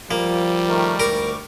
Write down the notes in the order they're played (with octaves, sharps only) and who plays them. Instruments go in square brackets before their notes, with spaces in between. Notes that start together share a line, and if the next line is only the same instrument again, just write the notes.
[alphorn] F3 [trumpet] G3 [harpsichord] A#3
[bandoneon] D#3 A3 A#4
[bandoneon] D2 C#6 D6 [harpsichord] A#4